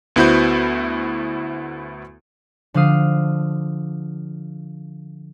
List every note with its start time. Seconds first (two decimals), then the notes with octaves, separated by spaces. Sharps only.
0.16 D2 B3 E4 F#4 C5 G6
2.74 D3 F3 D4 F5 D#6 C7